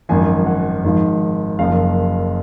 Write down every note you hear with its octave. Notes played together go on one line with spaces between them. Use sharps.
G#1 F#2 F3 G#5
F#5
G#1 G#2 F3
F#1 F#2 F3 F5